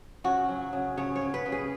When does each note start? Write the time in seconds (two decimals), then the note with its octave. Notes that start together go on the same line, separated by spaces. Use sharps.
0.24 C#3 F#4
0.49 F#3
0.73 C#3
0.97 C#3 C#5
1.16 C#5
1.21 C#3
1.34 B4
1.46 C#3
1.52 G#4